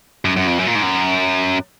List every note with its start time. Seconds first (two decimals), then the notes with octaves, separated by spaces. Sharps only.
0.25 F#2
0.36 F#2
0.47 F2
0.58 F#2
0.67 A#2
0.75 G#2
0.82 F#2